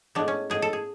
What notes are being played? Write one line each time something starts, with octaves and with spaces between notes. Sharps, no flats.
A2 G#3 B3 D4
C#4
A2 G#3 B3 G#4
A4
G#4